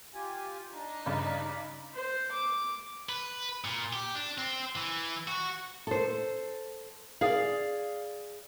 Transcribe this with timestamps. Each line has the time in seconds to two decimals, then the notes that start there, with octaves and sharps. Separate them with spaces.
0.14 F4 G4 G#5
0.73 D4 D#4
1.06 G2 C#3 D4 D5 B5
1.94 C5
2.31 D6
3.09 B4
3.65 A#2
3.93 G4
4.15 D4
4.38 C4
4.76 E3
5.28 F#4
5.87 A4 C5
7.21 G#4 D5 F5